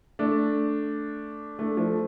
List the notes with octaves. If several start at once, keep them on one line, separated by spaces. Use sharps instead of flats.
A3 D4
A3 D4
F3 A3